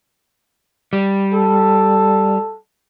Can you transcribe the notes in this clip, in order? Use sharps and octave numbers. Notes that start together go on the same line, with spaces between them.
G3
A4